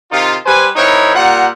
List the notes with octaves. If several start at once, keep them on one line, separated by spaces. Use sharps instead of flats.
C3 D#3 D#4 F4
G3 B4 C5 G#5
E3 C4 D#4 E4 A#4 C#5
A#2 G3 F4 A#4 F#5